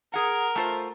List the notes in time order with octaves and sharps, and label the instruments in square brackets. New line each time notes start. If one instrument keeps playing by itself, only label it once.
[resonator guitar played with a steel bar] G#4 F#5 [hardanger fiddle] A#4
[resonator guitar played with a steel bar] A3 F4 C5